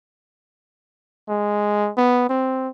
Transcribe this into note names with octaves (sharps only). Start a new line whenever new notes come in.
G#3
B3
C4